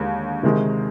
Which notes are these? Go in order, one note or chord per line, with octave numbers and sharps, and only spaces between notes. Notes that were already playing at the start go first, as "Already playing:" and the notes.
Already playing: D#2 D3 G#3
C3 D#3 G#3